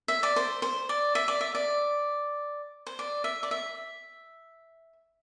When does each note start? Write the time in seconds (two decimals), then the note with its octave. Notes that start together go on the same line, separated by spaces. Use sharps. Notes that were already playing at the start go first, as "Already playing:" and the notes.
0.08 E5
0.23 D5
0.36 C5
0.62 C5
0.89 D5
1.15 E5
1.28 D5
1.41 E5
1.55 D5
2.87 C5
2.99 D5
3.24 E5
3.43 D5
3.51 E5